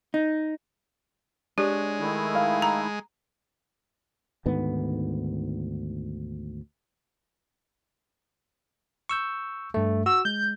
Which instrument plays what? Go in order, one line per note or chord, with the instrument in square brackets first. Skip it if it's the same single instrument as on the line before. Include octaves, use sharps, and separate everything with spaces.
[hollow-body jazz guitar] D#4
[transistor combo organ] G#3 [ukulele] D4 C#5 [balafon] G4
[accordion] D#3 A3 E4
[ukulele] F5
[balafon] A#5
[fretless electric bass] D2 G#2 D#3 B3
[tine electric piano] C#6 E6 G6
G2 A3
[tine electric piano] F#4 [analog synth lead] E6
[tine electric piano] G#3 [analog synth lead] G6